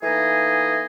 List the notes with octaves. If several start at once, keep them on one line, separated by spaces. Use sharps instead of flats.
E3 A3 A#3 D#4 G#4 D#5